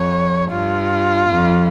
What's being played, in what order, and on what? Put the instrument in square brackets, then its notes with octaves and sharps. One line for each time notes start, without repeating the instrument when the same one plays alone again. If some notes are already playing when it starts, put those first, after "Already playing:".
Already playing: [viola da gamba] F2 [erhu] C#5
[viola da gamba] G2 [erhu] F4
[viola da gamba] F2